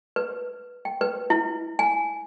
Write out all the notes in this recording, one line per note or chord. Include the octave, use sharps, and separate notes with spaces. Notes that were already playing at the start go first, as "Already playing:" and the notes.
B4
G5
B4
E4
G#5